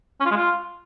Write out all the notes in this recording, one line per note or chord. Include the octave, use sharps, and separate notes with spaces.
C#4
F4
G#3
F4